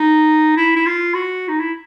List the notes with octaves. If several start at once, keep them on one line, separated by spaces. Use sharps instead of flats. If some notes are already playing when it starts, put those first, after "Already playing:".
Already playing: D#4
E4
E4
F4
F#4
D#4
E4